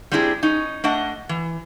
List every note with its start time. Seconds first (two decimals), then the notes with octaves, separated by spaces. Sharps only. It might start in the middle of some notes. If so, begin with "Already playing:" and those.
0.12 G3 C4 D4 E4 F#4 G#4
0.43 C#4 D#4
0.84 A3 D4 D#5 F#5
1.29 E3